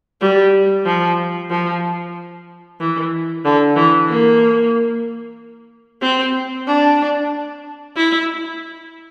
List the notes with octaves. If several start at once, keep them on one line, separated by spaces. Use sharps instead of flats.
G3
F3
F3
E3
D3
E3
A#3
C4
D4
E4